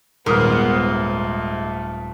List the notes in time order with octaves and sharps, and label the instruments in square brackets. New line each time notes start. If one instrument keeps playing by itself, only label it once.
[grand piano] D#1 D#6 F6 [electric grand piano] G#2 [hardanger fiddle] B3 C5 [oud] A#4
[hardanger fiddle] A3